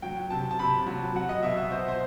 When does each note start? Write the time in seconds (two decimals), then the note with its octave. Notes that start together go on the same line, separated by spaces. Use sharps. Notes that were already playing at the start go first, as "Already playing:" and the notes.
0.02 F#3 G5
0.30 C3 A5
0.51 A5
0.59 C3 B5
0.87 F#3
1.15 F#3 F#5
1.29 D#5
1.43 B2 E5
1.57 E5
1.71 B2 C5
1.88 C5